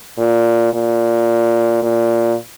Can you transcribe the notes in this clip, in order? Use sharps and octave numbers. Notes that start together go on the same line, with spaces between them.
A#2
A#2
A#2